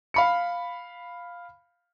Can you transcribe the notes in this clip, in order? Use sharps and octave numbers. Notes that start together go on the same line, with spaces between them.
F5 B5 C#7